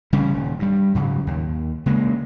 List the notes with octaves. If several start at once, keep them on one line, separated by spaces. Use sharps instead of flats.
C#3 G3 A3 C#4
D#1
G2 G3
G#2 C#3 F#3
D#2
C#3 G#3 A#3